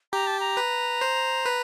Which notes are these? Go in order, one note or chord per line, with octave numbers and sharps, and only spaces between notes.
G4 A#5
A5
A#5
B4
C5
B4